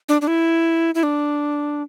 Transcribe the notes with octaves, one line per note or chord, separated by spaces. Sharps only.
D4
D4
E4
E4
D4